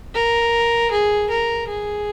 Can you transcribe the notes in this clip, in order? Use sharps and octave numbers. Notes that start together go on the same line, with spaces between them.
A#4
G#4
A#4
G#4